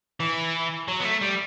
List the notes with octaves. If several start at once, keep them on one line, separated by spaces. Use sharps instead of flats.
E3
F#3
B3
A3
G3